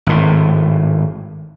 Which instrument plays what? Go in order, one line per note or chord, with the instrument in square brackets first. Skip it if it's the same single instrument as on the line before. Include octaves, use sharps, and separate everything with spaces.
[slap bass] G#1 A2